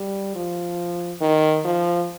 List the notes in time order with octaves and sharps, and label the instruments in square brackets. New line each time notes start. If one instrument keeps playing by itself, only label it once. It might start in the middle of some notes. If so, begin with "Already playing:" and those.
Already playing: [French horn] G3
F3
D#3
F3